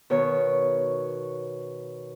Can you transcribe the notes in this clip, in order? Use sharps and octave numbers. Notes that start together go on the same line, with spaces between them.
B2 D#3 C#5